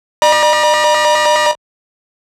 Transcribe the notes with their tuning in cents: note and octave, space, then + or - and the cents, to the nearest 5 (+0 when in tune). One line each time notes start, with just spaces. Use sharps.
D5 +45 A#5 +45